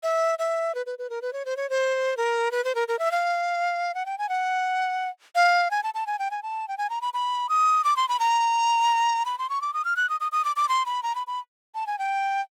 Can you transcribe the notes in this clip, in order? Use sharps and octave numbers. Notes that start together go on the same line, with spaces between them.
E5
E5
B4
B4
B4
A#4
B4
C#5
C5
C#5
C5
A#4
B4
C5
A#4
A#4
E5
F5
F#5
G5
G#5
F#5
F5
G#5
A5
A5
G#5
G5
G#5
A5
G5
G#5
A#5
B5
B5
D#6
D6
C6
B5
A#5
B5
C6
C#6
D6
D#6
F6
F#6
D#6
D#6
D#6
D6
D6
C6
B5
A#5
B5
B5
A5
G#5
G5